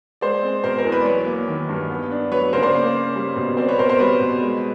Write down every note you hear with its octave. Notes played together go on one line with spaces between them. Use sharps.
G#3 C5 D5
C4
B2 A#4 C5
A#4 C5
E2
B4
D5
F#3 B4 C#5
A#3
D#3
G2
B3
D4
F#3 B4 C#5
C#3 A#4 C5
C5 D5
A#3
C#4
G3
B2
C4 C5 D5
B4 C#5
B2 A#4 C5
A#4 C5
G3 B4 C#5
B2
G#3